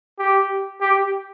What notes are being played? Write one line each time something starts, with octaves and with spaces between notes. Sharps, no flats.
G4
G4